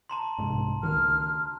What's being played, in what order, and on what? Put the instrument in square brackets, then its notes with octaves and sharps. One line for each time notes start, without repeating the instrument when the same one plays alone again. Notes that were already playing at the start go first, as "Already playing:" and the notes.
[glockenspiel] A5 A#5 C6
[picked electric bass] C2 G#2
[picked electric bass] C#2 D#3 [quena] F6